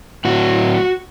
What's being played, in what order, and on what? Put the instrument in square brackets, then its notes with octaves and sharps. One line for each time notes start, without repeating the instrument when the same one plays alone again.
[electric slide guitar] A2 F#3 F#4